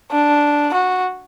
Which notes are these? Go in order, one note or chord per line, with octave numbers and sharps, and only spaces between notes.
D4
F#4